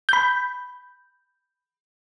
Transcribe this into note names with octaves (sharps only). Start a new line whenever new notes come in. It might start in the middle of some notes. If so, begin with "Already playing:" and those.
B5 G6